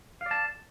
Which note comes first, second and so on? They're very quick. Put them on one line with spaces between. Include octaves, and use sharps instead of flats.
F5 D5 A5